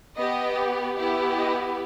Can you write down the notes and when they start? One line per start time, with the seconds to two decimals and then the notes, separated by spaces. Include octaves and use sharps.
0.17 B3 G4 D#5
0.97 B3 E4 G4
1.38 D#5